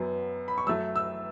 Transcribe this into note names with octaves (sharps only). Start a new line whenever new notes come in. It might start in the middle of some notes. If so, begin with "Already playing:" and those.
Already playing: F#2 F#3 B3
B5
C#6
F#2 F#3 A3 E6
E6